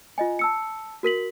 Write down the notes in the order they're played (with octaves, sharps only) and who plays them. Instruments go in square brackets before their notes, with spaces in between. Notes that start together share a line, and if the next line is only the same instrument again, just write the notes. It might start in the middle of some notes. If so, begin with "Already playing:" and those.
[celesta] F4 D#5 G#5
A5 E6 C#7
F#4 A#4 B6 F#7